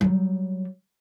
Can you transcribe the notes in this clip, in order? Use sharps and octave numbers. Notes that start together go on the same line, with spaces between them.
F#3 G3